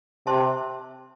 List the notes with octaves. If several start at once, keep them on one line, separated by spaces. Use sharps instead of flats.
C3 C5 E5 A5 C6